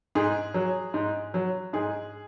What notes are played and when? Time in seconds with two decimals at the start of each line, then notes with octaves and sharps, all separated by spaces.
0.15 G#2 G#4
0.54 F#3
0.94 G#2
1.34 F#3
1.73 G#2 G#4